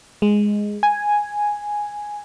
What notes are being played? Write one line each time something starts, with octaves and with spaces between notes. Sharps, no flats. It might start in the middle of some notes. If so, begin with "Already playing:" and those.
G#3
G#5